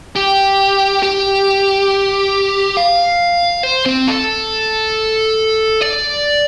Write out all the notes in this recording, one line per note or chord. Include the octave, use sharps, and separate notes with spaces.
G4
G4
F5
C5
C4
A4
D5